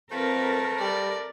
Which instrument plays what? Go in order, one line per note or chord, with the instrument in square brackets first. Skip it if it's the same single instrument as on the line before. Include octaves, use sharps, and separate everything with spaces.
[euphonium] F2 [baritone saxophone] A3 [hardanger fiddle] C4 B4 [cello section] A#4
[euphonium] G3 [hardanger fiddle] D5